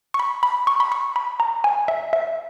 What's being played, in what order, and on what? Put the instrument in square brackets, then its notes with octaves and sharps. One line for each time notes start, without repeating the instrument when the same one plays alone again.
[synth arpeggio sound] C#6
B5
B5
C#6
B5
C#6
B5
A#5
G#5
E5
E5